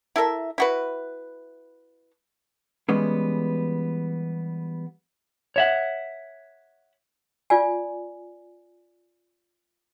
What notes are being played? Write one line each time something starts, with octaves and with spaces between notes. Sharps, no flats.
E4 A4 A#4 E5
E4 F#4 B4
E3 G3 G#3 B3 C#4
C#5 E5 F#5
F4 D5 G#5